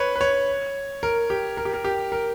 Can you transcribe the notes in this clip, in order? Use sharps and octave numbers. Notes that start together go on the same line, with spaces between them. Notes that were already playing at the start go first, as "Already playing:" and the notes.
Already playing: B4 C#5
B4
C#5
A#4
G4
A#4
G4
A#4
G4
A#4